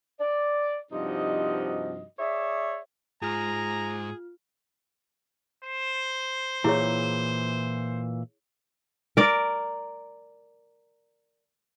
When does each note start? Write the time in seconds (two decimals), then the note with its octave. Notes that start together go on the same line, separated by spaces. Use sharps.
0.20 D5
0.92 G2 C3 F3 D#4 F#4 D#5
2.19 G#4 C#5 D5 E5
3.22 G#2 F4 G#4 A#5 F6
5.64 C5
6.64 A#2 E3 E4 G#4 C#5
9.17 A#4 D5